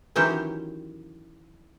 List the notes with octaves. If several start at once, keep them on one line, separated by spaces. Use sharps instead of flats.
D#3 E3 F#3 C#4 G4 C5